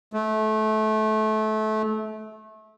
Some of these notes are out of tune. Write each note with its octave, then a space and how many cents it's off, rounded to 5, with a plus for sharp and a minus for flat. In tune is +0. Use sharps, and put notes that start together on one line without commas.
A3 -25